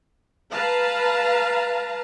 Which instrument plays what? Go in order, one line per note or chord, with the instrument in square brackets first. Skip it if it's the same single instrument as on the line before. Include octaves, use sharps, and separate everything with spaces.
[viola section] B4 F5 A5 A#5